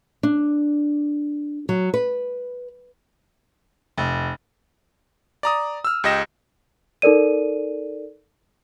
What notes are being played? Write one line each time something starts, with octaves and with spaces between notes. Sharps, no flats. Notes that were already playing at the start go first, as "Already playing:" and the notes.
D4
F#3
B4
F1
D5 A#5 D#6
E6 F6
C#2 G4 D#5 A#6 E7
D#4 A4 A#4 D5 D#7